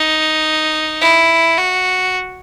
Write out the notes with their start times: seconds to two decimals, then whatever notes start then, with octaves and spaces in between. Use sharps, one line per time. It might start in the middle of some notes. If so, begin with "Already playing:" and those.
Already playing: D#4
1.02 E4
1.58 F#4